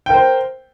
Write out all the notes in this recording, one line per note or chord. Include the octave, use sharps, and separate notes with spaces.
A#4 C5 G5